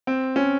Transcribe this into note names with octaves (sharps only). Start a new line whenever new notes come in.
C4
C#4